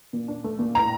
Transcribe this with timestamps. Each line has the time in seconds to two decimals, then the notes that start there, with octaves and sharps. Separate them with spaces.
0.13 A#2
0.28 D4
0.44 A3
0.59 A#2
0.75 A2 A#5